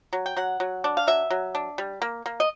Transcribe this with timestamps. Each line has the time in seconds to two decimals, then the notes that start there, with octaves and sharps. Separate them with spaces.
0.13 F#3
0.26 G5
0.37 F#3 F#5
0.60 F#3
0.84 D4
0.97 F5
1.07 F#3 E5
1.30 F#3
1.55 D4
1.78 G3
2.02 A#3
2.26 A#3
2.40 D#5